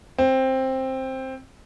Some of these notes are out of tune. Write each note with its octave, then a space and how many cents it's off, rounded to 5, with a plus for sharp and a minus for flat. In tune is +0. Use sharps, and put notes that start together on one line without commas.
C4 +10